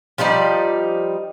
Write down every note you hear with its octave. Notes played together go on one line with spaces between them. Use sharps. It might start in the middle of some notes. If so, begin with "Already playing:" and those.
F3 G3 D#4 D5